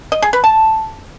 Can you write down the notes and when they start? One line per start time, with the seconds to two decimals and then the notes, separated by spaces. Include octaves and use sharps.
0.12 D#5
0.22 G#4
0.33 B4
0.44 A5